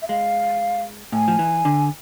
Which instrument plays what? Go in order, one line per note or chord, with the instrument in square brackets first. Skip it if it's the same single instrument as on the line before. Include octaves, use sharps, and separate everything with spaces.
[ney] E5
[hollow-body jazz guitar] G#3 [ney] F5
[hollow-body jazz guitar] A2 [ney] G#5
[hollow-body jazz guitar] F3
E3
D3